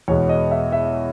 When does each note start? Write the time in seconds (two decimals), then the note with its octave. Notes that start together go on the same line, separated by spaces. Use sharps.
0.08 E2 B2 G#3 B3 C#5
0.29 D#5
0.51 E5
0.72 E5